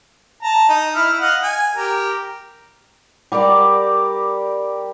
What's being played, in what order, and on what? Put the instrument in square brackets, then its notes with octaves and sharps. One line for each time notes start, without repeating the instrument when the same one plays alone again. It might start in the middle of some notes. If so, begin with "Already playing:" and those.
[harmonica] A5 A#5
D#4
E4 F6
D#5 F5 F#5
G#5
G4 A#4
[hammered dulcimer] G3 G4 A#4 D5